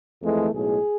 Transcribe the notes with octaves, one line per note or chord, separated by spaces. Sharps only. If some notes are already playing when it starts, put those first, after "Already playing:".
F2 E3 G#3 A3
B1 A2 G#3 G#4